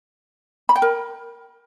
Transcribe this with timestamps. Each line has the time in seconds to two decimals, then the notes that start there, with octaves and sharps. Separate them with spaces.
0.69 B5
0.76 G5
0.82 A#4